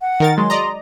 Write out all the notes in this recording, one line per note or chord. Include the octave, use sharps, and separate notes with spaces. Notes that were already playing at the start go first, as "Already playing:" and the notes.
F#5
D#3 A#4 A6
F#3 G#3 C6
D5 D#5 A#5